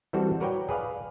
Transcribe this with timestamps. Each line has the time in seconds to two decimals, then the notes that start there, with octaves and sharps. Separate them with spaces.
0.13 E3 G3 C4 F#4 A4
0.40 F#4 A#4 B4 C#5 D5 G5
0.69 G#4 B4 D5 F5